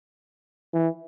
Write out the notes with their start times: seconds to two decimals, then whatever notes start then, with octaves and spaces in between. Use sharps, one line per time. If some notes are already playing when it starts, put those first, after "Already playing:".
0.74 E3